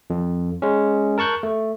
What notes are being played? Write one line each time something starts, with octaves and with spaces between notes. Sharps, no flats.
F2
G#3 C#4
A#4 A5 C#6 F#6 G6
A3